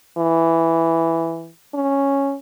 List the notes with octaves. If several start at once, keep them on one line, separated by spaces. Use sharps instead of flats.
E3
C#4